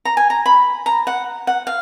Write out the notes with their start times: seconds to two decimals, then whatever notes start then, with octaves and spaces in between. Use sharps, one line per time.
0.05 A#5
0.17 G#5
0.30 A#5
0.46 B5
0.86 A#5
1.07 F#5
1.47 F#5
1.67 F5